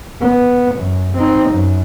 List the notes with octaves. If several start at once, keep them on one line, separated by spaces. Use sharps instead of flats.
B3
F#2
C4 D#4
F#2